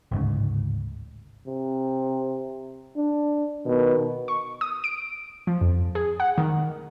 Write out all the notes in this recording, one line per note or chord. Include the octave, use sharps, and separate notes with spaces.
A1 D2 G#2 C#3
C3
D4
B2 D#3
C#6
D#6
D7
F3
F2
G#4
F#5
D#3